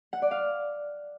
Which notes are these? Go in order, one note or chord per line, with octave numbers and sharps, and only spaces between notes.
F#5
D5
F5